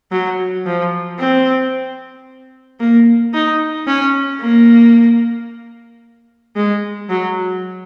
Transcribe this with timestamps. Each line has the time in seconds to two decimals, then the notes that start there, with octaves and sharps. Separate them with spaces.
0.11 F#3
0.66 F3
1.19 C4
2.80 A#3
3.34 D#4
3.87 C#4
4.41 A#3
6.56 G#3
7.09 F#3